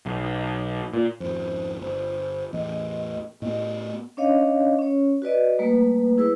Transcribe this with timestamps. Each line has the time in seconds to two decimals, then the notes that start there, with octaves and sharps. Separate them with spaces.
0.06 B1
0.94 A#2
1.20 G#1 F2 C5
1.82 G1 C5
2.53 A1 E2 D#5
3.42 A2 B3 D#5
4.17 C#4 D4 C#5 D#5 F5
4.79 C#4 C#5
5.22 F#4 B4 D5 D#5
5.59 G3 A3 A#3 B4
6.18 E4 G#4 B4 E6